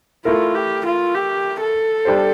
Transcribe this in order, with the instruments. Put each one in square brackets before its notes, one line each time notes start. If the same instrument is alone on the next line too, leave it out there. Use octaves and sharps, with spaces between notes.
[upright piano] A3 E4 A#4 [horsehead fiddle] F4
[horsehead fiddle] G4
F4
G4
A4
[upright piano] G3 D4 G4 C5